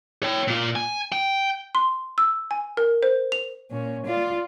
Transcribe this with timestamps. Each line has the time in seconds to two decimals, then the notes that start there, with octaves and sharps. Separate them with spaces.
0.23 C#5 G5
0.48 A#2 F4
0.76 G#5
1.12 G5
1.75 C6
2.18 E6
2.51 G#5
2.77 A#4
3.03 C5
3.32 F7
3.70 A#2 C#4
4.05 F4 D5